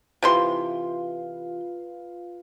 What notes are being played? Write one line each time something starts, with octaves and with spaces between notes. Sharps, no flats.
C3 E3 F4 B4 F5 C6